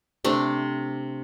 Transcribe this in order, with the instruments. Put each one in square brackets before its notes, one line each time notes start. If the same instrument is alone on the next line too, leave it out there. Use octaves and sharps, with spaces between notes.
[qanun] C3 A3 D4